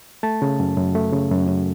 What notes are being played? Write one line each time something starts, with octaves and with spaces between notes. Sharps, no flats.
A3 A5
C#3
F#2
F#2
A3
C#3
F#2
F#2